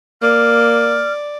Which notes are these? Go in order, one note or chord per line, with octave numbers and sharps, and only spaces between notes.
A#3 D5 F6